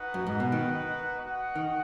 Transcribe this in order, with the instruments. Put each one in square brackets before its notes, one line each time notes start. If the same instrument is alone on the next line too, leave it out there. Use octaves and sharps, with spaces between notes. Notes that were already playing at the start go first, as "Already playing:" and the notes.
Already playing: [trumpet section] D#4 F#4 B4 D#5 F#5
[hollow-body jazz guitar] F#2
G#2
B2
D#3
[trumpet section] F#4 D#5 F#5
[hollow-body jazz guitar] D#3